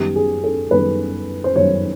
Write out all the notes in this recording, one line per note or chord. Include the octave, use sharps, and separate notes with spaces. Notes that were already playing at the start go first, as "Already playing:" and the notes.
Already playing: F#2 D#3 G3 B3 G4
G#4
A4
F#2 D#3 G3 B3 B4
C5
F#2 D#3 G3 B3 C#5